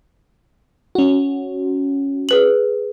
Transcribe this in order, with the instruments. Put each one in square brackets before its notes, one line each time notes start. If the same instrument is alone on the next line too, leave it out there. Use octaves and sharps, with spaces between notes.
[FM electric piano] C#4 F#4
[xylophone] G#4 B4 F#7